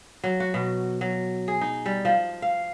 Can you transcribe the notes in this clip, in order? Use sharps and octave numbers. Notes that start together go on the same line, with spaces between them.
F#3
F#4
B2
F#3
G#4
D#4
G3
F3
F5